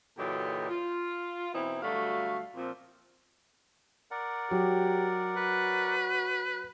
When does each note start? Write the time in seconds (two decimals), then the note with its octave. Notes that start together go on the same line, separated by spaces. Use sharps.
0.18 A#2 D3 E3 F#3 D#4 G4
0.69 F4
1.53 B2 E3 C4 D#4 E4
1.83 D2 F#3 G3 A3 F#4 F5
2.56 A#2 F3 C4
4.11 A#4 D5 F#5
4.51 F#3 G4
5.37 F#4 B4